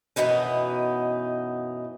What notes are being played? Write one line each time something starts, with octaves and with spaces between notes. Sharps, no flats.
F#2 B2 E3 B3 D#4